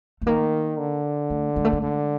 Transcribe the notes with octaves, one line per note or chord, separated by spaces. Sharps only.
A3
D#3 A#3
D3
A3
G#3
A3
G#3
D3